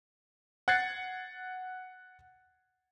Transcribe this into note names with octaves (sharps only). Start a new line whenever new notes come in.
F#5 F#6 G#6 A6 C7 C#7